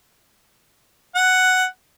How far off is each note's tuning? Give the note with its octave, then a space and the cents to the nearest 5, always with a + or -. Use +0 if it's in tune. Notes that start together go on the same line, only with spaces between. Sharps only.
F#5 +5